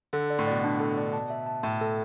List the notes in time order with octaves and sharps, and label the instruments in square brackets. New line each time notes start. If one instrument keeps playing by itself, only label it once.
[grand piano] D3 [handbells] A4
[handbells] D5
[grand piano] A2
[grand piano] B2 [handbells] D5
[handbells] D4
A4
D5
A5
E5
A5
[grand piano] A2 [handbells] E5
[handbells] A4